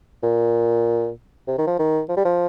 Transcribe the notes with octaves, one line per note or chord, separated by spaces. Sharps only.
A#2
C3
D#3
F3
D#3
F3
G3
F3